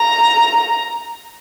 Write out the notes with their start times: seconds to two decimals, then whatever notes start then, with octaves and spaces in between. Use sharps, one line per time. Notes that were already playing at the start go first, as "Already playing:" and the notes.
Already playing: A#5